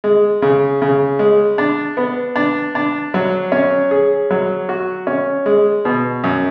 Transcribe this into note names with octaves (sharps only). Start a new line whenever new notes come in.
G#3
C#3
C#3
G#3
D4
B3
D4
D4
F#3
C#4
G#4
F#3
F#4
C#4
G#3
B2
F#2